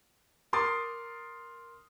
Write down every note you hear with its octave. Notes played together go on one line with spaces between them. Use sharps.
A#4 C6 D6 D#6 A6